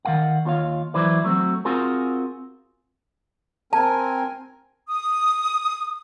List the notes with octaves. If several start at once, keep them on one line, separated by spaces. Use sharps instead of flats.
D#3 G#3 A#4 F5 F#5
D#2 F4 C#5 F5
E3 F#3 E4 B4 C5 D5
F#3 A3 C4 F#4
C4 F4 F#4 G#4 A#4 C5
C4 A#4 G#5 A5
D#6